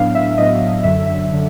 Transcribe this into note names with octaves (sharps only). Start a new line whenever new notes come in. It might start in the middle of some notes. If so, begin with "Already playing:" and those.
Already playing: A2 F#3 B3 D4 F5
E5
A2 F#3 B3 D4 D#5
F#2 D3 F#3 E5
E5
D3